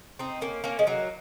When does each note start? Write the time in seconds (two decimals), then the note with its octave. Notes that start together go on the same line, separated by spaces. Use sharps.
0.19 C4 D#4
0.41 A#3 C#4
0.64 A#3 C#4
0.79 G#3
0.87 F#3 A#3